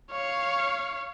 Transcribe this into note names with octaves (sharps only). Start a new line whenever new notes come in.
C#5 F5